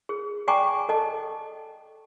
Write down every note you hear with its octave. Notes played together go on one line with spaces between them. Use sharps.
G#4
D5 G5 G#5 A#5 C#6 D6
A4 D#5 A5